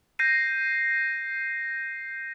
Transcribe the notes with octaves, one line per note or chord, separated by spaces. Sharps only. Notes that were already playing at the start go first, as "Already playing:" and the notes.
G6 A#6 C7 D#7